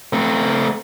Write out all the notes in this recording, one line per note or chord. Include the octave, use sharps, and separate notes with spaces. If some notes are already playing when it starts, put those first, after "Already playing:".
A3 C4